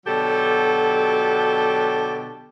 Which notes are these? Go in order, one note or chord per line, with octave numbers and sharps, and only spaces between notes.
B2 D3 F#3 G4 A4